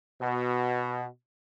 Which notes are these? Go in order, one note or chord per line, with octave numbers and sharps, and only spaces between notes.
B2